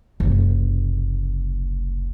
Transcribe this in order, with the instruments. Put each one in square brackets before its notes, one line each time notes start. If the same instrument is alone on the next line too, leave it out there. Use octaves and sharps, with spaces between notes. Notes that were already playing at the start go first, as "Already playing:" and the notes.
[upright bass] F#1 C2